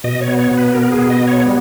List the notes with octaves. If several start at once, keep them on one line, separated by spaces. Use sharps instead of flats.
B2 D#5
C#5
B3
C#5
B2
B4
B3 A#4
G#4
B2
D#5
B3
C#5
G3